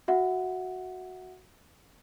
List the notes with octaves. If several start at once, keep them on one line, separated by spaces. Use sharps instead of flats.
F#4 E5 F#5